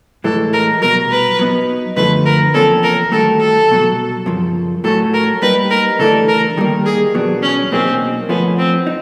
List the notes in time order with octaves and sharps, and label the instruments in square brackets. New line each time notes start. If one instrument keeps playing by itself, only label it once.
[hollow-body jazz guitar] A2 E3 G#3 [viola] A4
[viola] A#4
[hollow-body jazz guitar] C2 B2 F#3 [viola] A#4
[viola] B4
[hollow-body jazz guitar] F#3 B3 D#4
[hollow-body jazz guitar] F#2 D3 F3 A3 [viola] B4
[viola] A#4
[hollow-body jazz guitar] E2 C3 F3 A#3 C#4 [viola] A4
[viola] A#4
[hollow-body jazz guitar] G2 D#3 F#3 A3 [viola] A4
[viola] A4
[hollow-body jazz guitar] C2 B2 F#3
F#2 C#3 F3
[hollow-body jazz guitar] A2 F#3 A3 C#4 F#4 [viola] A4
[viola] A#4
[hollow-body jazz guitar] G3 A#3 D#4 [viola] B4
[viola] A#4
[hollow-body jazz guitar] C#3 E3 A3 D4 [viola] A4
[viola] A#4
[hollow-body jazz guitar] D#3 G3 A#3
[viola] G#4
[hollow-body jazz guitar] E2 B2 F#3 B3 D4
[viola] C#4
[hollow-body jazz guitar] B2 F#3 A#3 D#4 G#4 [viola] C4
[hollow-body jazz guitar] F3 A3 C#4 [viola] B3
[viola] C4
[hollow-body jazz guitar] D#4